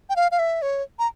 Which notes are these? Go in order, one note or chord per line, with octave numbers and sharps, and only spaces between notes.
G5
F5
F5
E5
C#5
A#5